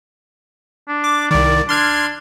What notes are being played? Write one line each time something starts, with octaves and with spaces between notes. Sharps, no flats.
D4
D6
C2 D#3 D5
D4 C6 F6 G#6